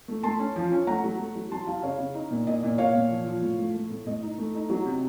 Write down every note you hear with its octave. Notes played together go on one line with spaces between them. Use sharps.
A3
A3 A5 C6
C#4
F3
C#4
A3 F#5 A#5
F#3
A3
F#3
F#3 A5 C6
F#3 F5 A5
C#3 C#5 F5
C#3
D#4
A#2
A#2 D#5
A#2
A#2 C#5 F5
A#2
F3
F3
A2
A3
A3
A2
A2 D#5
D#4
A3
D#4
F#3
C3